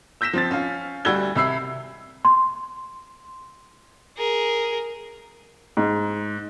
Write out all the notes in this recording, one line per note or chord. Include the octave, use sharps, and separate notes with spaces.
E6 G6 A#6 B6 E7
F3 C4 A6
C#4 F5
D2 G3 F#4 E6 G#6 G7
C2 C3 E5 B5 E6 C7
C6
G#4 A#4
G#2